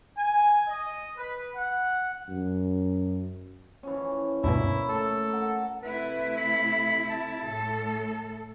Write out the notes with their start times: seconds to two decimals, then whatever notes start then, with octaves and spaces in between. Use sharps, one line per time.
0.17 G#5
0.68 D#5
1.17 B4
1.55 F#5
2.29 F#2
3.83 E3 F3 C#4
4.44 D2 G2 B2 A#3 C#4 E4
4.89 A3 A4
5.29 A#4 F#5
5.83 C3 A3 E4 B4
6.37 B5
7.10 A5
7.46 A2 A4